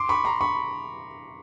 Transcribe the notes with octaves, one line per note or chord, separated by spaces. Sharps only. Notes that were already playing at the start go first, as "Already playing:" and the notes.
Already playing: C6 D6
B5 C#6
A#5 C6
B5 C#6